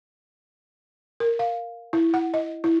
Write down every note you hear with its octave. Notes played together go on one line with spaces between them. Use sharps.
A#4
F5
E4
F#5
D#5
E4